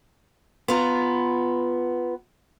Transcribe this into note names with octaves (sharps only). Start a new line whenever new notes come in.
B3 F4 A#5